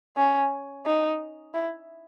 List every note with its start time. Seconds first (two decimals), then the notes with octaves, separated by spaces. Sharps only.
0.17 C#4
0.86 D#4
1.54 E4